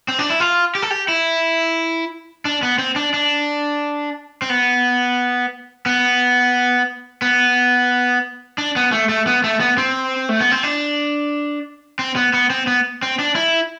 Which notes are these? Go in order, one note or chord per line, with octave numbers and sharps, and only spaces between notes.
C4
D4
E4
F4
G4
A4
G4
E4
D4
B3
C4
D4
D4
C4
B3
B3
B3
D4
B3
A3
A3
B3
A3
B3
C4
A3
B3
C4
D4
C4
B3
B3
C4
B3
C4
D4
E4